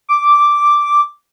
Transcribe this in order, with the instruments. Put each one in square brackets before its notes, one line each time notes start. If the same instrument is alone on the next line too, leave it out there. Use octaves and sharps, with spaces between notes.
[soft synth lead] D6